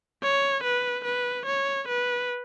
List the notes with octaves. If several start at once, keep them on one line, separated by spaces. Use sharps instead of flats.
C#5
B4
B4
C#5
B4